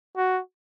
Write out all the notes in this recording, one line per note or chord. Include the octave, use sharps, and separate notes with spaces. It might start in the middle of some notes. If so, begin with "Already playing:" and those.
F#4